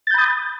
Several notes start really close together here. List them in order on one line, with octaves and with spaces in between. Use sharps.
A6 G6 B5 D#6